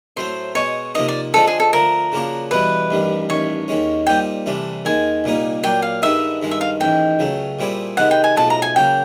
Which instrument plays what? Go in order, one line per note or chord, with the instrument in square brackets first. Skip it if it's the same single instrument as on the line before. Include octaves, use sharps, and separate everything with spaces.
[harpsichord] A2 F#3 A3 C4 [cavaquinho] C5
[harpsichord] B2 G#3 B3 [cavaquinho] C#5
[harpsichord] C3 F3 A#3 D#4 [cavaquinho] D#5
[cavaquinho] D5
[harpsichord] D3 F3 G#3 C4 F4 [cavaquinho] A4
[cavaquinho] G#4
A4
[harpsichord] D3 F3 A3 [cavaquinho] A#4
[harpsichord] C#3 F3 A#3 D4 F#4
[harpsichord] E2 B2 G3 B3 E4 [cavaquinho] B4
[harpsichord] A1 G2 D#3 G3
[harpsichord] A1 G2 D#3 [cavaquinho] C#5
[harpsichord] D#2 D#3 G#3 C#4
[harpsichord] A#2 G3 C4 D#4 [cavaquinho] G5
[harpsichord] C2 C3 E3 A3 D4
[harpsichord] D#2 D#3 G#3 [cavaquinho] G#5
[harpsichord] C2 A#2 G3 A#3 D#4
[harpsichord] A#2 F#3 A#3 D4 [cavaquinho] G5
[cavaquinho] F5
[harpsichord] G2 D#3 G#3 B3 D#4 [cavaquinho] E5
[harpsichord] G2 D#3 G#3
[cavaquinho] E5
F5
[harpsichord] A1 G#2 D#3 [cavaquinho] G5
[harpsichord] C#2 C#3 F#3 A3
A#2 G3 C4 E4 G#4
[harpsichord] C3 D#3 G#3 B3 [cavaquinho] F#5
[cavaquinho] G5
G#5
[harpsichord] B1 A2 F3 G#3 [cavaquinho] A5
[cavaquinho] A#5
G#5
[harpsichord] C#3 F#3 A#3 [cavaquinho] G5